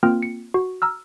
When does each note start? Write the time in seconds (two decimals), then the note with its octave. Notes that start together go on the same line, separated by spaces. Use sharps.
0.03 A#3 C4 F4 G5 F6
0.23 C#7
0.54 F#4
0.82 A#5 E6 F6